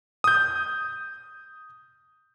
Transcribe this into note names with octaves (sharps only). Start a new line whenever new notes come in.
D#6 G6